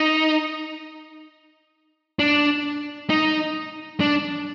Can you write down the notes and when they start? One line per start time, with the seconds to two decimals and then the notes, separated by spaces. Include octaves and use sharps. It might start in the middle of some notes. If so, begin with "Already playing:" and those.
Already playing: D#4
2.19 D4
3.10 D#4
4.00 D4